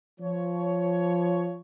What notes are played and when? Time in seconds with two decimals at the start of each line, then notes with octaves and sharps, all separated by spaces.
0.19 F3 C#5